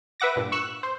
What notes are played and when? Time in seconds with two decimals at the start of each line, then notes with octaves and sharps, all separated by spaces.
0.20 B4 E5 F#5 D6 A#6
0.36 G2 A#2
0.52 C#6 E6 F#6
0.83 C5